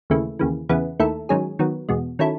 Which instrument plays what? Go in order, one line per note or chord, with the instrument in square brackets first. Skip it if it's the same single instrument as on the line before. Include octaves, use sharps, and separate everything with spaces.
[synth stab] D#2 C#3 E3 A3
D#2 C#3 E3
E2 C#3 E3 B3 E4
D#2 D#3 A3 E4 A4
G#2 D#3 F#3 C#4 G#4
D#3 F#3 B3
E2 B2 G#3
D#3 F#3 C#4 E4 A4